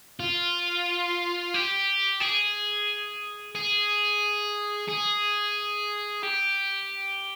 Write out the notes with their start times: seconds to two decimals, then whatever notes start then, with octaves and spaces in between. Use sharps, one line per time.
0.20 F4
1.54 G4
2.21 G#4
3.55 G#4
4.89 G#4
6.23 G4